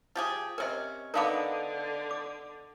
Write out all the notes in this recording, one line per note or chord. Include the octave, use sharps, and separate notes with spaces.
F3 G4 G#4
C3 C#4 A#4 D#5
D3 B3 D4 D#4 A#4 F5 D6
D6